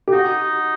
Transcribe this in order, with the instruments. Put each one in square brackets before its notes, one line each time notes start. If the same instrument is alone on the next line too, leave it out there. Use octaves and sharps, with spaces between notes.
[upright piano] G4
[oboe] D#4 [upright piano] F#4